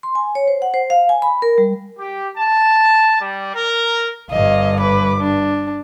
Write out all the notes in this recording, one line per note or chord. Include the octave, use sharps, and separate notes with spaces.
C6
G#5
C#5
C5
F#5
C5
F5
G#5
B5
A#4
G3
G4
A5
G3
A#4
G1 G2 D#5 F5
B4 D6
D4